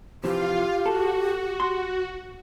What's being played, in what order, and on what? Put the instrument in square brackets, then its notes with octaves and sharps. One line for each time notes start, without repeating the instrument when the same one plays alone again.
[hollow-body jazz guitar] C3 E3 F3 [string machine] F4 F5 [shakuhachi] G4
[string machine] F#4 [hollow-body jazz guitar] A4
[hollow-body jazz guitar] C6